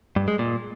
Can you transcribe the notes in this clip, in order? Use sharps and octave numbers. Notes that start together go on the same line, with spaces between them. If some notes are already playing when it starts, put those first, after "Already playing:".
G2
G#3
A#2